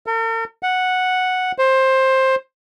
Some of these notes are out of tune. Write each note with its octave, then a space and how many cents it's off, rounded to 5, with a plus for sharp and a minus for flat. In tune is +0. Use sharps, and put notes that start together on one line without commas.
A#4 -45
F#5 -5
C5 +15